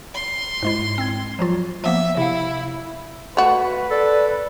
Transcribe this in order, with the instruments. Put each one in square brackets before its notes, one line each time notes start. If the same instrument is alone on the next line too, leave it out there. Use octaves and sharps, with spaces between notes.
[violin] C6
[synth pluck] G#2 G#3 E4
C4 G#6
F3 F#3 F4
[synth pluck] F3 A#3 B3 [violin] E5
[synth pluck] C3 F5 [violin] E4
[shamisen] A3 F#4 [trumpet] B4
[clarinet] A4 [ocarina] D5